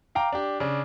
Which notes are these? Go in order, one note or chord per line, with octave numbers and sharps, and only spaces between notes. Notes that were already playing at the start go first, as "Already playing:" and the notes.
F5 G5 A#5 D6
D4 G4
C#3 D4